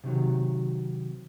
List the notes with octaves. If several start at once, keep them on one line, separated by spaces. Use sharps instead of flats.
C3 D#3 F#3